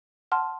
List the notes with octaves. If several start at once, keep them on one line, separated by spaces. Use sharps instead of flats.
F#5 A5 C6 F6